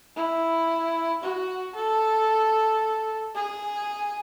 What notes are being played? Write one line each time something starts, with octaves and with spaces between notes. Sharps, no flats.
E4
F#4
A4
G#4